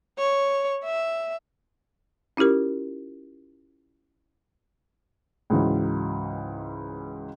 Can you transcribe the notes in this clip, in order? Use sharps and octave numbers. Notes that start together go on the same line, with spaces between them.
C#5
E5
C#4 E4 F4 G4 A#4
C#2 G#2 E3 F#3